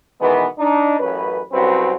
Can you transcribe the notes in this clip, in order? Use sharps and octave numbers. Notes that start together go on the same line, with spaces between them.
B2 D#3 E3 G#3 B3
D4 D#4
A1 F#2 C#4 B4
C2 F#2 F#3 C4 F#4 B4